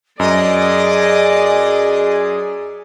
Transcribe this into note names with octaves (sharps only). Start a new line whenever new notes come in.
F#2 G#4 D5 D#5